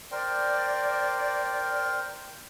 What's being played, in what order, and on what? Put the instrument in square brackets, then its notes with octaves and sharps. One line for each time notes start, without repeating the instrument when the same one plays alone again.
[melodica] A#4 C5 G5 [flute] D5